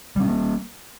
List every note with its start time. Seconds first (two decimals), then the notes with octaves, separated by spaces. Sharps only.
0.16 G3
0.20 C4
0.23 C#4
0.27 A#3